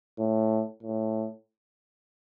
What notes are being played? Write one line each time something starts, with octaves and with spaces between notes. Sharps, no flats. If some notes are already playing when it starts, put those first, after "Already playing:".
A2
A2